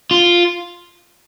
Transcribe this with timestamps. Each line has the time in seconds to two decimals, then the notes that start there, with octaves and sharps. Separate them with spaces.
0.11 F4